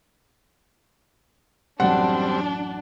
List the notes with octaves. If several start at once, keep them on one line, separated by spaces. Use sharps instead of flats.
A1 F#2 G3 C4 D4 F#5